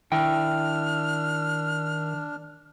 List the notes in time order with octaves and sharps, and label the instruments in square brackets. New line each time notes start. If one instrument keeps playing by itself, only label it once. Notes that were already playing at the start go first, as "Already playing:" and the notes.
[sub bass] D#3 [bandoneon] D4 [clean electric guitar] E4 G5 [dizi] F6